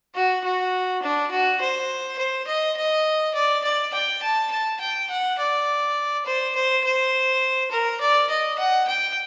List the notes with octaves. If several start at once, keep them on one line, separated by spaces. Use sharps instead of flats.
F#4
F#4
D4
F#4
C5
C5
D#5
D#5
D5
D5
G5
A5
A5
G5
F#5
D5
C5
C5
C5
A#4
D5
D#5
F#5
G5